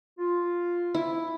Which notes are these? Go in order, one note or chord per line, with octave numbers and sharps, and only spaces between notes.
F4
E4